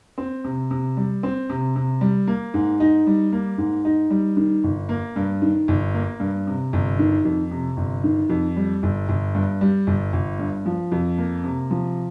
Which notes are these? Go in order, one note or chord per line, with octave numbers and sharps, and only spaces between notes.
C4
C3
C3
G3
C4
C3
C3
G3
A#3
G#2
D#4
G3
A#3
G#2
D#4
G3
D#3
G1
A#3
G2
D#3
G1
A#3
G2
C3
G1
D#3
F2
C3
G1
D#3
F2
G3
G1
G1
G2
G3
G1
G1
G2
F3
F2
A#3
C3
F3